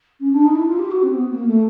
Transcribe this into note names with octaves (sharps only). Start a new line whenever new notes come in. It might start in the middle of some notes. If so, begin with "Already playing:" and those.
C#4
D4
D#4
E4
F4
G4
F#4
C4
B3
A#3
A3